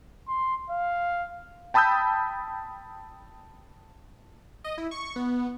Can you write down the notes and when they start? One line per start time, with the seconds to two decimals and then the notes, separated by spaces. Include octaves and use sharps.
0.28 C6
0.70 F5
1.74 G5 A5 B5 D#6 E6 G6
4.64 D#5
4.78 E4
4.91 C#6
5.16 B3